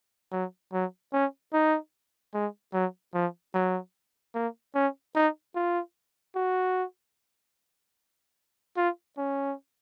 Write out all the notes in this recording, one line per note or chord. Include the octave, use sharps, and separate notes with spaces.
F#3
F#3
C#4
D#4
G#3
F#3
F3
F#3
A#3
C#4
D#4
F4
F#4
F4
C#4